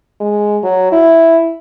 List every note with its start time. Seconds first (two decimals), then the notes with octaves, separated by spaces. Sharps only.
0.21 G#3
0.63 F#3
0.92 E4